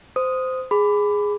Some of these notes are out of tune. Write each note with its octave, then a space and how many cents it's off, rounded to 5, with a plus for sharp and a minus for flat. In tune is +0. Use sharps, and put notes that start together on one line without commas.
C5 -15 D#6 +0
G#4 +0 B5 +20 D6 +0